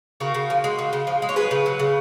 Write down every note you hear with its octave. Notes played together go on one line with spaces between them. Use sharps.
C#3 F#4 A#4
C#3
F3
G#3
C#3
C#3
F3
G#3
C#5
F#3 G#4 B4
C#3
F#3
C#3